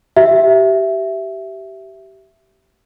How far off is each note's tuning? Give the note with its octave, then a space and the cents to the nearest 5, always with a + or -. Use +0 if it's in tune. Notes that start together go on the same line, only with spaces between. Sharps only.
G4 -25 E5 +5